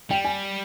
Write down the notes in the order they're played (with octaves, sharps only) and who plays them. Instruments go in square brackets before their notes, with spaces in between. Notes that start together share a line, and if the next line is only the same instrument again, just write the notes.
[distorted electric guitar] G3 [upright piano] G5
[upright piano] G#5